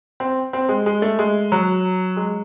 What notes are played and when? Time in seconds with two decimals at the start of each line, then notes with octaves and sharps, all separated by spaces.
0.20 C4
0.53 C4
0.69 G#3
0.86 G#3
1.02 A3
1.19 G#3
1.52 F#3
2.17 G#3